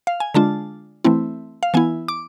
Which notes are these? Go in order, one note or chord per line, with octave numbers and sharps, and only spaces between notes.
F5
G#5
D3 G#3 D4 F4 A5
E3 A3 C4 E4
F5
E3 B3 E4 G#5
D6